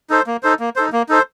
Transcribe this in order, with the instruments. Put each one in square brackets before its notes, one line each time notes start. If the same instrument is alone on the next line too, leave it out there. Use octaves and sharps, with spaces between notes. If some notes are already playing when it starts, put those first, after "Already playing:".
[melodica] D#4 A4 C5
A#3
D#4 A4 C5
A#3
D#4 A4 C5
A#3
D#4 A4 C5